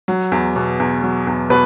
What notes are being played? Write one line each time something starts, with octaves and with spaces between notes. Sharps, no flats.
F#3
E2
B2
E2
F#3
E2
B2 B4